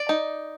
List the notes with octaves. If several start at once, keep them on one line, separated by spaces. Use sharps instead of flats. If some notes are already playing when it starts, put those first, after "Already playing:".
Already playing: D5
D#4